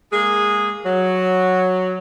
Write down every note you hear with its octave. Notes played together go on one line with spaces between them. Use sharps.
G#3 A#3 G#4
F#3